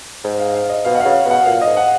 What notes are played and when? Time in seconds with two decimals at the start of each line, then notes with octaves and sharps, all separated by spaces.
0.24 G#2
0.39 F5
0.54 F5
0.69 D#5
0.85 B2 F5
0.95 F#5
1.00 C#3 F5
1.25 B2
1.30 F#5
1.46 A#2 F5
1.61 G#2 D#5
1.77 F#5